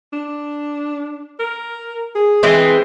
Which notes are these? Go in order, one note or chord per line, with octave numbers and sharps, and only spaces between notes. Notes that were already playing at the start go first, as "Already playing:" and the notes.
D4
A#4
G#4
E3 G#3 C4